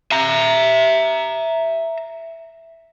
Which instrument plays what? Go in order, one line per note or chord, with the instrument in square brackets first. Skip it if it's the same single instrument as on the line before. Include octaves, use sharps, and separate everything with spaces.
[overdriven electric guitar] E5 A#5